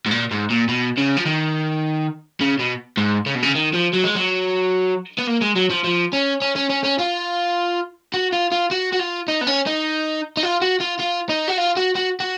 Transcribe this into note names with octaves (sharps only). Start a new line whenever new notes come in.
G#2
A#2
G#2
A#2
B2
C#3
F3
D#3
C#3
B2
G#2
C#3
B2
C#3
D#3
F3
F#3
G#3
F#3
B3
A#3
G#3
F#3
F3
F3
C#4
C#4
C#4
C#4
C#4
F4
F#4
F4
F4
F#4
F#4
F4
D#4
B3
C#4
D#4
D#4
F4
F#4
F4
F4
D#4
F#4
F4
F#4
F#4
F#4